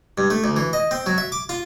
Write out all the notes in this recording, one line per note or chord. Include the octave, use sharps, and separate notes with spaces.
G2
A3
D2
E3
D#5
C4
F#3
E5
D6
F4